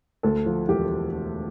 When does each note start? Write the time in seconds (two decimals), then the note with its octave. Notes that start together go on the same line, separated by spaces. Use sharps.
0.23 D2 A4
0.46 F3
0.69 E1 G4